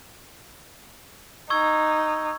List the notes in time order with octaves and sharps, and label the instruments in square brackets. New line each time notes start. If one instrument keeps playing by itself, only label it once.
[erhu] D#4 [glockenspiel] C#6 E6 G#6